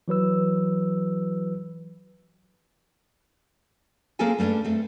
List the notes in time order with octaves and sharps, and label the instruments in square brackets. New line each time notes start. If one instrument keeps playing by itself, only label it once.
[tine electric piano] E3 F#3 B4 E6
[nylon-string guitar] A#3 C4 C#4 G#4 A4 G#5
G2 A3 A#3 C#4 D4
A3 C4